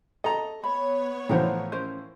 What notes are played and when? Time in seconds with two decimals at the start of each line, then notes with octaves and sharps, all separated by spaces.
0.24 A4 D#5 A#5
0.64 B3 C#5 B5
1.29 A2 E3 F3 C5 F#5 A#5
1.72 C#4 A#4 C5